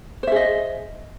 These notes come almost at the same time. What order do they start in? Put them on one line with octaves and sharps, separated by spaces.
C5 E5 G#4 D#5